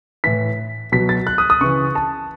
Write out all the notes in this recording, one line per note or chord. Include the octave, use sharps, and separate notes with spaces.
A2 E3 B6
B2 F#3 B6
A6
F#6
D#6
D#6
C#3 E3 C#6
A5